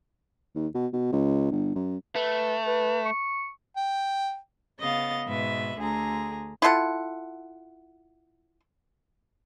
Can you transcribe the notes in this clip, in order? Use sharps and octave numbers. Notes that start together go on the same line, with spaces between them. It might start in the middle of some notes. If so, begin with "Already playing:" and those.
D#2
B2
B2
C#2
G1
F#2
A3 B4
B4
C#6
G5
C#3 B3 D#5 F5 A6
G#2 B2 B4 E5
D2 D3 G#4 A#5
E4 F4 A4 F#5